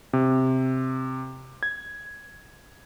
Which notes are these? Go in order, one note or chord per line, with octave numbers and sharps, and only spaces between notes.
C3
G#6